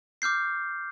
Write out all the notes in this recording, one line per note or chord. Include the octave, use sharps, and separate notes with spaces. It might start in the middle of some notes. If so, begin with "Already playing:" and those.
D6 F6 G6 C7